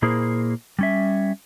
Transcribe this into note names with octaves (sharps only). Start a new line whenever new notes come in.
A#2 A#3 E4 G#4 A#4 C5
G3 C#4 E5